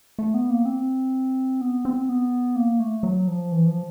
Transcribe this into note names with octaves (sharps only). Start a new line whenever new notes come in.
A3
B3
A#3
C4
B3
C4
B3
A#3
A3
F#3
F3
E3
F3